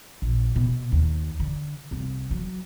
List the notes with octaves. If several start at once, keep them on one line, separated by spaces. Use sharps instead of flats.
A#1
B2
D#2
D3
C2
F#3